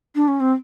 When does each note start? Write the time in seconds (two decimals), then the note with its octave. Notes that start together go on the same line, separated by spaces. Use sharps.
0.15 D4
0.28 C#4
0.40 C4